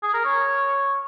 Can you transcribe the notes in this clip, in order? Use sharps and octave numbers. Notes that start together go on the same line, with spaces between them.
G#4
A#4
C#5